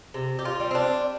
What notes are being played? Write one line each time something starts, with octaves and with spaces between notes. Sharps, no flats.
C3
G4
F4
G3
C4
D4